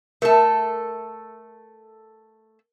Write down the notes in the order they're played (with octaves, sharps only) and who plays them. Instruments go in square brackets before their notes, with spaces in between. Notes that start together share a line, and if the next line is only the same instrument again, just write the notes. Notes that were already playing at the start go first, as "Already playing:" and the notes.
[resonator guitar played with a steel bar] A3 A4 [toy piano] A#4 E5